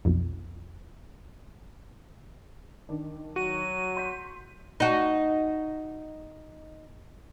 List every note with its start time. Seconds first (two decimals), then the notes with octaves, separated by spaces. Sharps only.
0.05 B1 F2
2.89 D#3 D4
3.36 F#3 F#4 D#7
3.97 C6 G6 B6
4.80 D#4 F#4